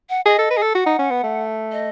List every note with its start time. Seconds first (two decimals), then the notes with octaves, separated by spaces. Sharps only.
0.10 F#5
0.26 G#4 D#5
0.38 A4
0.50 B4
0.57 G#4
0.62 A4
0.75 F#4 F#5
0.86 D#4
0.99 C#4
1.11 B3
1.23 A3
1.72 D#5